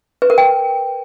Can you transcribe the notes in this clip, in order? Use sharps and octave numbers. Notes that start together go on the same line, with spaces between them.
B4
A#4
G5